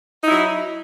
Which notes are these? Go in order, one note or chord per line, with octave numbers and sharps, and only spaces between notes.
F#3 D#4 E4